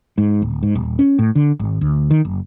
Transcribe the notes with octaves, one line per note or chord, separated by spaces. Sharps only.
G#2
D1
G#2
D#1
C#4
A2
D3
G#1
D2
D#3
F#1